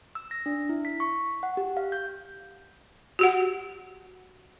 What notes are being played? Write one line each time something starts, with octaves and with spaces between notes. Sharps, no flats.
E6
A#6
D4
E4
B6
C#6
F#5
G4
F5
G6
F#4 G4 F#5